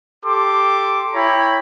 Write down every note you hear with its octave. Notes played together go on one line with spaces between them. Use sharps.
G4 A4 C6 D6
E4 C#5 G5 A#5 B5